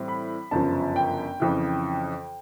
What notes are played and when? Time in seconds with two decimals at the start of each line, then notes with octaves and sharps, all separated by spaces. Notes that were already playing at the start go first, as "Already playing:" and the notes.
Already playing: A2 E3 G3 C4 E4
0.08 B5
0.51 G1 F#2 C#3 F3 A5
0.96 G5
1.40 F2 C#3 E3